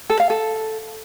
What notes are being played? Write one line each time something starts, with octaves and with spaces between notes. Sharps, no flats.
A4
F5
A4